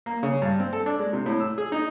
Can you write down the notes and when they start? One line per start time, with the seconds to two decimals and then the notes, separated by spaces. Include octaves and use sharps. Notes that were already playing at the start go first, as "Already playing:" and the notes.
0.06 A#3
0.23 C#3
0.42 G2
0.60 C4
0.73 A4
0.86 D4
0.99 G#3
1.13 C3
1.26 A2
1.40 E6
1.58 G#4
1.72 D#4